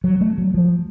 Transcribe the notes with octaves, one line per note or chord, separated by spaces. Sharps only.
F#3
A3
F#3
F3